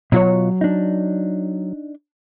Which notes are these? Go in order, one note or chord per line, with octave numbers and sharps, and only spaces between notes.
B2 F#3 F4 C#5
D4 D#4